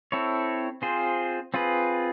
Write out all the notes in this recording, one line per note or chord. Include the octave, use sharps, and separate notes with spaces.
C4 E4 A4 C#5
C4 F4 G#4 C5
C4 F4 G#4 B4